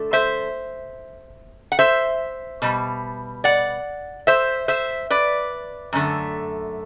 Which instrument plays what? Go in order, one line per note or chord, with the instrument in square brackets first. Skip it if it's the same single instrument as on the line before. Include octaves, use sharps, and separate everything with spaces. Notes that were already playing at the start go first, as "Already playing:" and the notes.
Already playing: [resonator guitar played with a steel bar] D3 A3
C5 E5
F#5
C5 E5
B2 G3
D5 F#5
C5 E5
C5 E5
B4 D5
F#2 D3 A3